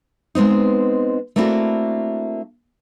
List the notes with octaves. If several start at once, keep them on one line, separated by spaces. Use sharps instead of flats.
G#3 B3 C4 D#4
A3 A#3 C4 D4 E4 F#4